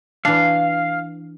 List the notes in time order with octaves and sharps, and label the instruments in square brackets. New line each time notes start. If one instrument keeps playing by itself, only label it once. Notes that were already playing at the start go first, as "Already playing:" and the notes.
[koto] E3 D4 [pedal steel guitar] F5